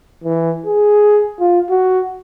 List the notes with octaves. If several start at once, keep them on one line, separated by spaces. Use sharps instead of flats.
E3
G#4
F4
F#4